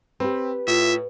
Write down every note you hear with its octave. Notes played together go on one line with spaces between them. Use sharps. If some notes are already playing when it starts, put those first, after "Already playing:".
C4 G4 B4
A2 F4 E5